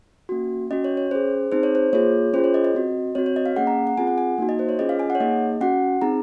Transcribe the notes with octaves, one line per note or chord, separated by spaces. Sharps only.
A#3 C#4 F#4
C#4 F#4 D#5
C#5
C#5
C#4 G#4 C5
C4 D#4 G#4 C5
C#5
C5
A#3 F4 G#4 C#5
C#4 F4 G#4 C5
C#5
D#5
D#5
C4 F#4
C4 F#4 C#5
C#5
D#5
F5
A#3 C#4 G#4 F#5
A#5
F#5
C4 F4 G#4 G#5
F#5
G#5
A#3 D#4 F#4
D#5
C5
C#5
C#4 F4 G#4 D#5
F5
G#5
F#5
C#5
A#3 D#4 G#4 D#5
C#4 F#4 F#5
C4 D#4 G#4 A#5